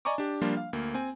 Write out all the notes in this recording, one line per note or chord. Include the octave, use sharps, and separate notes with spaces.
D5 D#5 G#5 A#5 C#6 D6
D4 G4
F3 G3 A#3 D4 F4
F5
D2 A#3
C4 G#5